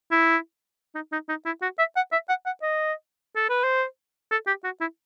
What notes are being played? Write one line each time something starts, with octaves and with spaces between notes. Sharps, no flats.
E4
D#4
D#4
D#4
E4
F#4
E5
F#5
E5
F#5
F#5
D#5
A4
B4
C5
A4
G4
F#4
E4